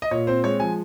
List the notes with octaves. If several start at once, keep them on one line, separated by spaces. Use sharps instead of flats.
D#5
A#2 C#5
C4 C5
G#3 C#5
F3 G#5